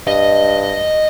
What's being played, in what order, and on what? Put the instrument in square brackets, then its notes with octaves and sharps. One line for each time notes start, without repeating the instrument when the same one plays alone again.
[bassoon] G2 [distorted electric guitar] D#5